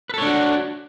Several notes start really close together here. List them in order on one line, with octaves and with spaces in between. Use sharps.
B4 A4 C#5 D4 F#4